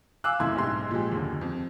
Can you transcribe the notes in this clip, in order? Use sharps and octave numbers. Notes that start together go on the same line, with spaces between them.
F5 G#5 D6 E6 F#6
F#1 C2 A2 E4 C6 G#6
B1 G#2 G4 C6
A#2 F3 G#3 G4
F#1 D#2 D3
F2